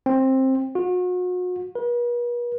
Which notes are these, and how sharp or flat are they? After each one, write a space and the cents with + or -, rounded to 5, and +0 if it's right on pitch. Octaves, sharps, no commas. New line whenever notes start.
C4 +15
F#4 -40
B4 -45